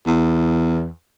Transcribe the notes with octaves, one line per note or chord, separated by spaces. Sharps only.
E2